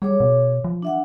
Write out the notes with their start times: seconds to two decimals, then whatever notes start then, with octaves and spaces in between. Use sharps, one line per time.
0.02 G3 G#4 C#5 D6
0.20 B2
0.64 F3
0.82 D4 E5 F#5